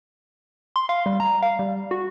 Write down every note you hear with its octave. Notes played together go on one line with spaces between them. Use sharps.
C6
F5
G3
A#5
F5
G3
F#4